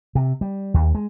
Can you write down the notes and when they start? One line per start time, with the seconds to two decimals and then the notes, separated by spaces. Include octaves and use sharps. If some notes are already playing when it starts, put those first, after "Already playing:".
0.15 C3
0.41 G3
0.74 D#2
0.95 G#3